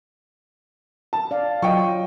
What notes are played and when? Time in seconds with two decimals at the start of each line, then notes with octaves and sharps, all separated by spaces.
1.13 A5
1.31 D5 F5
1.62 F#3 F4 D#5 G5 C#6